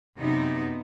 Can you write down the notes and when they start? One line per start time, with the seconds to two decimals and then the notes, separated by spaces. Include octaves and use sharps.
0.17 F#2 C3 B3 D#4